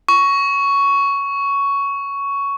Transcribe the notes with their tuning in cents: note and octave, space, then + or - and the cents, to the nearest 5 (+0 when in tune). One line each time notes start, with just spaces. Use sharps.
C#6 +10